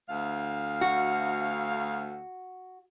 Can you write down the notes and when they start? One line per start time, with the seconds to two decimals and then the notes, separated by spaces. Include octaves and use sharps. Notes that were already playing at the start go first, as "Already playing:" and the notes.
0.09 D2 F5
0.81 F#4